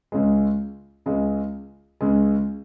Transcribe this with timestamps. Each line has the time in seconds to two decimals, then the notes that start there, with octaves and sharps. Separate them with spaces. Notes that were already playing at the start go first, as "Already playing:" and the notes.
0.12 C#2 C#3 G#3
1.06 C#2 C#3 G#3
2.01 C#2 C#3 G#3